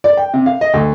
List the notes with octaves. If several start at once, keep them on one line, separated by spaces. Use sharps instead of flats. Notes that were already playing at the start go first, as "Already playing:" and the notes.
D5
G5
C3
F5
D#5
D2